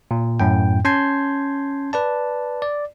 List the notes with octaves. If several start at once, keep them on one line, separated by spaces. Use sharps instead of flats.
A#2
F#2 A2 G5
C#4 A5 C6 G6 G#6 C7
B4 D5 A5
D5